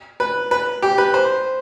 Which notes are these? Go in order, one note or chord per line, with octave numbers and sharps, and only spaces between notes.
B4
B4
G4
B4
C5